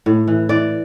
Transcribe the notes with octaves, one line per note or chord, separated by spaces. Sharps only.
A2
E3
E3 D5